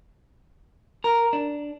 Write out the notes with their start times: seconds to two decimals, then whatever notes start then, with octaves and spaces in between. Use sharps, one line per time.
1.04 A#4
1.33 D4